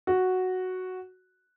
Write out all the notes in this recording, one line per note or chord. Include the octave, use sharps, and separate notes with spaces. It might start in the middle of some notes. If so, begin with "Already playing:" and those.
F#4